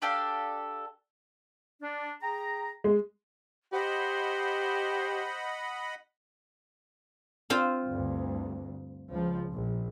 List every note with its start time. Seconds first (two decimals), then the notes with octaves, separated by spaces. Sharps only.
0.02 D4 G4 A4 F5
1.82 D4
2.22 G#4 G5 A#5
2.84 G#3
3.73 G4 C5 D#5 F#5 B5
7.50 C4 F4 C5
7.88 D2 G2
9.11 C#2 F3
9.53 A#1